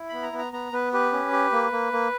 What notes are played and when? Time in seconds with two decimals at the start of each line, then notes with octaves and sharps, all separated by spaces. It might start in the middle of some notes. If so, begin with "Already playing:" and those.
Already playing: E4
0.09 B3 B5
0.23 A#5
0.33 B3
0.38 A#5
0.53 B3 A#5
0.73 B3 B4
0.93 G4 B4
1.13 C#4
1.32 G4
1.52 A#3
1.72 A#3
1.93 A#3